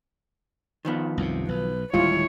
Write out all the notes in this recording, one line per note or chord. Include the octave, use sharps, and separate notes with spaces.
D#3 F3 B3
C2 F#2 C3
B1 B4
D1 D#2 G3 G#3 E4 F4 C#5